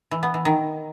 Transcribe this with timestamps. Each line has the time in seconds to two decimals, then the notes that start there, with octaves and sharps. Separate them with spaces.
0.11 E3
0.23 B3
0.34 E3
0.45 D#3